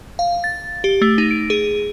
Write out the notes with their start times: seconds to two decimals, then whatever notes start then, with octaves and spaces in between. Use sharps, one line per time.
0.19 F5
0.44 A6
0.84 G4
1.01 A3
1.18 D#4
1.31 D7
1.50 G#4